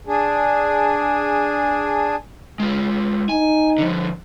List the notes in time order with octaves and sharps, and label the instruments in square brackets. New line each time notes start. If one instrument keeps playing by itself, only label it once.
[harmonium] D4 G#4
[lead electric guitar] G#3 F4
[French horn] D#4 [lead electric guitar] G#5
[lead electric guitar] D3 F3